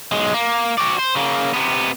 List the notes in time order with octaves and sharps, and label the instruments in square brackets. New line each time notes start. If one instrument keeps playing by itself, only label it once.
[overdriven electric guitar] B1 G#3
A#3
F#4 D5
C5
C#3 A#3
C3 B3